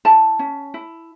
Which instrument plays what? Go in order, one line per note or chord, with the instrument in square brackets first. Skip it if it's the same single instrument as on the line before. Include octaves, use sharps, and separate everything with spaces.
[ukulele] E4 A5
C#4
E4